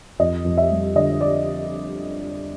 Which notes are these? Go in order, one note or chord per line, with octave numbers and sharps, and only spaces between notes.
F2 D#5
F2
E5
G3
D3 D#5
D5